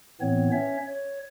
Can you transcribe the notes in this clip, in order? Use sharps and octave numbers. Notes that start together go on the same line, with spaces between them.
A2 E3 B3 C4 C#5
C#4 C#5 E5
C#5